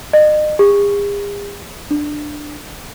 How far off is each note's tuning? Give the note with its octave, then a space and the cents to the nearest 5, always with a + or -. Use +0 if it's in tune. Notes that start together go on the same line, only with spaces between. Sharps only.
D#5 -35
G#4 -45
D4 +15